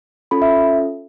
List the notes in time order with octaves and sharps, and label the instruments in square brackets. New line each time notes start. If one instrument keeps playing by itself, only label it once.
[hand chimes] C#4 F4 A4 B5
E5